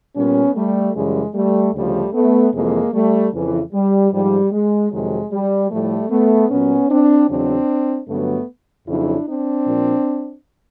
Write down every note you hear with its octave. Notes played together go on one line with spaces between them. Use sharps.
A#2 G3 B3 C#4
G3 A3
F#2 C#3 E3 G3 G#3
G3 A3
D2 C#3 F3 G3 A3
A3 B3
F2 C3 E3 G#3 A#3
G3 A3
F2 C#3 E3
G3
G#2 F3 G3
G#3
F2 C3 D#3 F#3 G#3
G3
A2 F3 G3 A3
A3 B3
A#2 F#3 B3 C#4
C4 D4
E2 C#3 F#3 C4 D4
G2 D3 F#3 A3 B3
F2 C#3 F#3 D4 E4
C4 D4
A#2 F3